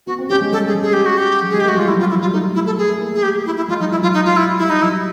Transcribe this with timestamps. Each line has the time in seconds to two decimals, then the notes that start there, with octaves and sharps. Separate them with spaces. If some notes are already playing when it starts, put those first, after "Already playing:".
0.07 B3 F#4
0.18 C4
0.29 C#4 G4
0.41 G#3
0.52 G3 A4
0.67 G#4
0.75 G#3
0.83 G#4
0.93 G4
1.06 F#4
1.18 G4
1.42 F#3
1.50 G#3 G#4
1.60 G4
1.65 A3
1.68 F#4
1.76 G3 F4
1.87 G3 E4
1.95 F#3
1.99 F3 F4
2.10 E4
2.15 F#3
2.21 G3 F4
2.33 A3 D#4
2.55 E4
2.66 A4
2.78 A3 G#4
2.89 A3
3.00 A#3
3.12 A3 G#4
3.23 G4
3.46 E4
3.56 E4
3.68 G#3 F4
3.80 F#3 D#4
3.91 F3 E4
4.02 F#3 F4
4.14 D#4
4.25 F4
4.36 E4
4.59 G3 E4
4.70 D#4
4.82 F#3 E4